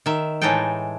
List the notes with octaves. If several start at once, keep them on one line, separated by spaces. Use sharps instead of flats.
D#3 E5
A2 E3 G#3 D#4 A4 G5